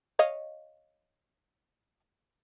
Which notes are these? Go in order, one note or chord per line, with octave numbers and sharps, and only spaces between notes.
C#5 D#5 F5